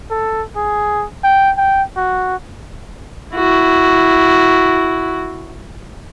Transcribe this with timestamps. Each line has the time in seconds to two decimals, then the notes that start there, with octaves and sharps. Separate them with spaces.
0.11 A4
0.56 G#4
1.24 G5
1.58 G5
1.97 F#4
3.35 E4 F#4